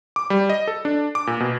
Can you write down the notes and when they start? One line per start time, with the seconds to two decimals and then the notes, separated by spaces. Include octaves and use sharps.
0.16 D6
0.30 G3
0.50 D#5
0.67 A4
0.85 D4
1.15 D6
1.27 A#2
1.40 B2